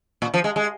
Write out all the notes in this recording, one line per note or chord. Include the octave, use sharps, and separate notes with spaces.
A#2
F3
G#3
G#3